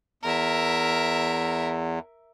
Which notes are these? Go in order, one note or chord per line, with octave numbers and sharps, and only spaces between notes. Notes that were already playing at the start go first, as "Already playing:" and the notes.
E2 A#4 E5